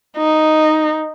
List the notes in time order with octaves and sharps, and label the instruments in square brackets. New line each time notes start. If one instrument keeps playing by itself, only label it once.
[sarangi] D#4